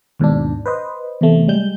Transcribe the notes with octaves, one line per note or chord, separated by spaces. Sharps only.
D#2 G#2 B2 D4
B4 C5 D#5
E2 C3 A3
G3 G#3 G6